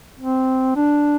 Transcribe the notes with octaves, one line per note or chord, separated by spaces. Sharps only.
C4
D4